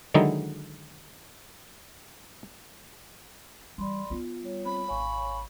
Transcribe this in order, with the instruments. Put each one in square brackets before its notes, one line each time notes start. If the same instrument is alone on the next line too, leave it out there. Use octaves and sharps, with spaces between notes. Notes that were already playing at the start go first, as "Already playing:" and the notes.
[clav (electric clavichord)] D3 D#3 F#3 G#3 D#4 E4
[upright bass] E3 G3 [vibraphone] D5 B5 C6
[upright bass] B3 D#4 [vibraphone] F4
[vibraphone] G3 F4 C#5
[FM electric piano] C4 [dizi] B5
[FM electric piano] G#1 C#5 [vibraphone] F5 G#5 C#6